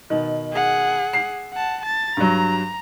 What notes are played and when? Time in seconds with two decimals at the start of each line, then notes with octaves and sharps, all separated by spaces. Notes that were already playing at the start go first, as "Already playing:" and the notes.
0.10 B2 D#3
0.53 G#4 F#5
1.13 C7
1.53 F#5 A5
1.82 A5 A6
2.17 G2 F#3 A#5